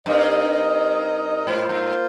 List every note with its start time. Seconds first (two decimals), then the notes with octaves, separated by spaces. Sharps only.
0.06 G2 C4 D#4 A#4 D#5
1.46 G#2 A#3 F4 C5
1.69 G2